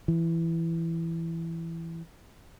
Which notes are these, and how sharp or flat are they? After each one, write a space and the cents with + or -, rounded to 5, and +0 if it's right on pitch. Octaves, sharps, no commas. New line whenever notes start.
E3 +10